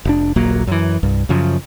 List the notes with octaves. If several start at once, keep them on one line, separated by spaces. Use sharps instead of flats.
F1 D4
D#1 A#1 F#3 A#3
F#2 E3
C2 G2
F#2 C#3 F3